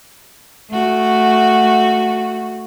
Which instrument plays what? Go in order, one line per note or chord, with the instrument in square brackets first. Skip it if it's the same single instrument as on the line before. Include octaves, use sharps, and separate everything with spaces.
[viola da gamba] A3 F#4